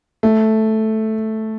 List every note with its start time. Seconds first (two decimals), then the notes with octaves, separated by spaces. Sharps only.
0.23 A3